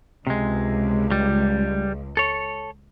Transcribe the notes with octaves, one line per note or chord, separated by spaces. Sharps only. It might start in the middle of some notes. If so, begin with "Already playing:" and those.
C#2 C3 G#3
G3
A4 C#5